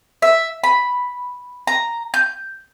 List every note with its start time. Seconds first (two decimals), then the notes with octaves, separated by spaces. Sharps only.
0.22 E5
0.64 B5
1.67 A#5
2.14 G6